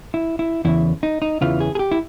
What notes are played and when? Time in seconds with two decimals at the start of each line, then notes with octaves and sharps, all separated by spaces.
0.14 E4
0.39 E4
0.65 E2 C#3 E3 E4
1.03 D#4
1.22 D#4
1.41 E2 C#3 E3 F4
1.60 G#4
1.75 G#4
1.79 G4
1.92 E4